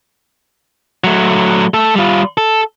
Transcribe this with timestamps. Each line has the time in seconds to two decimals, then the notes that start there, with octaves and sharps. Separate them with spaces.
1.04 F#3 A3
1.74 A3 A4
1.95 G3 F4
2.38 A4